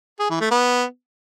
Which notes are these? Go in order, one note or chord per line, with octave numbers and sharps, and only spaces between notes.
G#4
E3
A3
B3